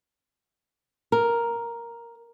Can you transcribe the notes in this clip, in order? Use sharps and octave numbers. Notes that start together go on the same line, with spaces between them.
A#4